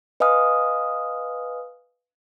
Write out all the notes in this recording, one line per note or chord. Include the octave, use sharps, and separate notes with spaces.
B4 D#5 F5 G#5 D#6 F6